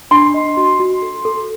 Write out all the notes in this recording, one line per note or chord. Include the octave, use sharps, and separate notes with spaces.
D4 C6
D#5
F#4
F#4
A4
A4